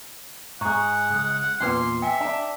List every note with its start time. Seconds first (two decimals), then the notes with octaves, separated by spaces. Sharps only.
0.61 G#2 G#4 F#5 A#5 C#6
1.10 C#2 G#3
1.60 E2 A#2 C#4 D4 B4 C6
2.02 E5 G5 G#5
2.21 D4